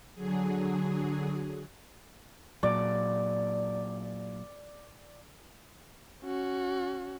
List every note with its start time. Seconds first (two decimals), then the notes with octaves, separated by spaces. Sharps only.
0.14 D3 F#3 G#4
2.63 A#2 F#3 D5
6.23 C#4 F#4